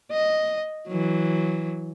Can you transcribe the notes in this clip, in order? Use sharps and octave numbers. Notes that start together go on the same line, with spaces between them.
D#5
E3 F#3